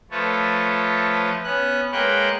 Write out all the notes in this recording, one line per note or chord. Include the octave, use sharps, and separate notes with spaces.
F3 A3 A4 B4 C#5
B3 C#4 F#6
G#3 A#3 B4 C#5 G5 F#6